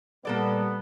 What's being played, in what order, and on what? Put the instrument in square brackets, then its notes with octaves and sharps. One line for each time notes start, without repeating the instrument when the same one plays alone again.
[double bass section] A#2 G3 [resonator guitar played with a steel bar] A#3 A4 D5 [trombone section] B3